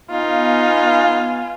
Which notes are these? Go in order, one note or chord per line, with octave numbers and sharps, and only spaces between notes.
B3 D#4 F4 F5 G#5